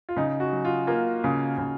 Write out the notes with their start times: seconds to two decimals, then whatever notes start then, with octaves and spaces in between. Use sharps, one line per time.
0.09 F4
0.16 C#3 D#4
0.40 F#4
0.52 F#3
0.65 F4
0.87 A#3 F4
1.24 C#3
1.58 C#3